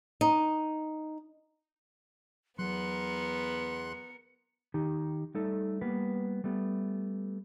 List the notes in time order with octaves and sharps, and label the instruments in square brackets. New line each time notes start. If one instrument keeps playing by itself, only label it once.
[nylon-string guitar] D#4
[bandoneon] E2 C6 F#6 [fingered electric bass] F#3 [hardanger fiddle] B3 A#4 [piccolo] C#7
[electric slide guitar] D#3 D#4 G4
G3 A3 D#4 A4
G3 A#3 B3 B4
G3 A3 B3